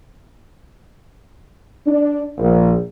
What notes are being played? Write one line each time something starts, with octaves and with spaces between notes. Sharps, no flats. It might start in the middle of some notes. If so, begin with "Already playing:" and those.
D4
A#1